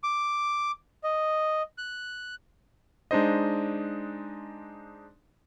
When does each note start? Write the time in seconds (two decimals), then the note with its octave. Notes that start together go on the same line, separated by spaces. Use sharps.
0.03 D6
1.04 D#5
1.78 F#6
3.11 G#3 D4 D#4 C5 D#5